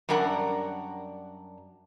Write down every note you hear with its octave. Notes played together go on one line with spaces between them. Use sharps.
F#2 G3 D4 A#4 F#5